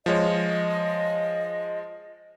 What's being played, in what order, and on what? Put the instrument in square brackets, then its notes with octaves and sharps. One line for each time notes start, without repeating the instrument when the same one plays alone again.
[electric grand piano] F3 G#3 C#5 [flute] D#5